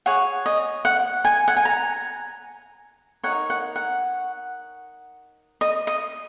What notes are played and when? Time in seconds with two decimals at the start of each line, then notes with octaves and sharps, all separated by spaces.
0.06 G#4 C#5 F#5
0.46 D#5
0.85 F#5
1.25 G#5
1.48 F#5
1.57 G#5
1.65 A#5
3.24 D#4 A#4 C#5 F#5
3.50 F#5
3.76 F#5
5.61 D#5
5.87 D#5